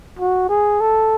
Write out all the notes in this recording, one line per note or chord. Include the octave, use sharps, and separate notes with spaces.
F#4
G#4
A4